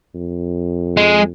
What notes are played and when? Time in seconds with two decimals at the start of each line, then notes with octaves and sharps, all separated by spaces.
0.15 F2
0.97 G#3